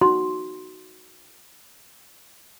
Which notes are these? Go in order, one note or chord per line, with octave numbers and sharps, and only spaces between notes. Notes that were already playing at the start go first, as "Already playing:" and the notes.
D#4 F#4 C6